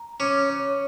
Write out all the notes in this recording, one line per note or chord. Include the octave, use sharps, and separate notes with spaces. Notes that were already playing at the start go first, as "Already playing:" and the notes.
Already playing: A#5
C#4 D6
C#5